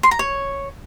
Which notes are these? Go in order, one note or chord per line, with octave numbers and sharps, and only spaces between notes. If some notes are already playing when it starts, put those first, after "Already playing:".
C6
A#5
C#5